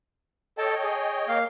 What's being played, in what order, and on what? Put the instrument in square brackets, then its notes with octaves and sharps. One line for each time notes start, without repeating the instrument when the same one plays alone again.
[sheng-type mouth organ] A4 A5 [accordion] C#5 D#5 G5
[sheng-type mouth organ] G#4
A#3 F5